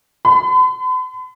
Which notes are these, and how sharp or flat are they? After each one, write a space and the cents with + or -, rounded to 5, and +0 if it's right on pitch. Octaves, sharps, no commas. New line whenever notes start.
B5 +45